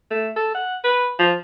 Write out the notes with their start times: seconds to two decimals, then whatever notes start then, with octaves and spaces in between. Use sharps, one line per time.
0.10 A3
0.36 A4
0.54 F#5
0.84 B4
1.19 F3